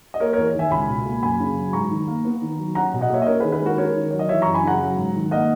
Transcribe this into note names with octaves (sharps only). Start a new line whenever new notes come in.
D#5
A#3 A#4 C#5
E2 A#4 C#5
D#3 E5 G#5
C#2 G#5 B5
B2
A#3
F#2 G#5 B5
C#3
F#3
G#2 A#5 C#6
D#3
A#3
B3
D#3
F#3
C#4 F#5 A#5
B2
D#5 F#5
A#3 C#5 E5
D#5
C#4 A#4 C#5
D#3 G#4 B4
G#4 B4
G#3 F#4 A#4
C#4 A#4 C#5
D#3
F#3 C#5
D#5
E3 C#5 E5
F#2 A#5 C#6
G#5 B5
C#3 F#5 A#5
F#3
G#2
D#3
A#3 D#5 F#5